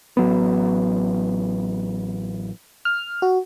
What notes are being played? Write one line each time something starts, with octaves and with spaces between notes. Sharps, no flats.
A1 F#3 B3
F6
F#4